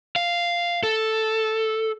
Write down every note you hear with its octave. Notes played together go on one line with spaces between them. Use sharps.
F5
A4